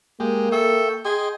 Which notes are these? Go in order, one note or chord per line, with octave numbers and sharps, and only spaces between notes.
G#3 A#3 G4
A4 E5 G5 C#6
G#4 D#5 G5 C6